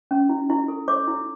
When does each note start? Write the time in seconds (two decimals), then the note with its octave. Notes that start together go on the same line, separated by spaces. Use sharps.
0.11 C#4
0.29 E4
0.50 E4
0.68 A4
0.88 C#5 D6
1.08 E4